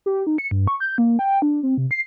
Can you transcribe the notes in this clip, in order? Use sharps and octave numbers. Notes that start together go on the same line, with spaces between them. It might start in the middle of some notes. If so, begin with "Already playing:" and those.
G4
D#4
C#7
G2
C#6
G6
A#3
G5
D4
C4
C3
C7